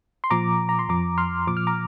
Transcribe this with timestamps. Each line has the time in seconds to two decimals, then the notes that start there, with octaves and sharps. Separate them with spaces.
0.24 C6
0.30 A#2 F3 A#5 D6
0.69 A#5
0.79 C6
0.89 F2 F3 A#5 D6
1.18 C6 F6
1.47 A#2 F3 D6
1.57 F6
1.67 A#5 D6